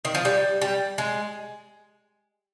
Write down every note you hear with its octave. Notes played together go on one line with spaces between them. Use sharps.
D#3
F3
G3
G3
G#3